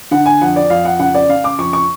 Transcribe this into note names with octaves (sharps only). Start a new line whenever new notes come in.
D3 F#5
G#5
F2 F#5
D5
F2 F5
F#5
C#3 F#5
D5
C#3 F5
D6
F2 C#6
C#6